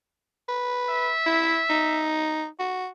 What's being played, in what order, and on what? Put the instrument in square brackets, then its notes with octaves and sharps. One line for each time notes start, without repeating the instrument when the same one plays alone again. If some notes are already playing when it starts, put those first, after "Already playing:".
[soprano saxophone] B4
[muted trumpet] E5
[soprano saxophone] E4
D#4
F#4